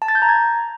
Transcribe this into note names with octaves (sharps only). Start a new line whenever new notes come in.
A5
A6
G6
A#5
G#6